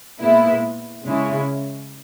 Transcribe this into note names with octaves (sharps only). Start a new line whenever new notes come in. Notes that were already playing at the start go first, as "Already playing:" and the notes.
A#2 G#3 B3 E4
C#3 G#3 C#4 E4